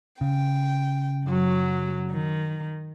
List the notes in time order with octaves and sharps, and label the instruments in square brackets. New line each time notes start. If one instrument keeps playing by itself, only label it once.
[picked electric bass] C#3 [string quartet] G5
[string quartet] F#2 F#3
D#3